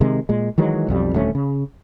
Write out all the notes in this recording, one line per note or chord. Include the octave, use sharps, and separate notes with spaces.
C3 D#3 G#3
A#2 G#3
D#3 E3 F#3 G#3
B1 F2 G3
D#1 D2 A3 C#4
C#3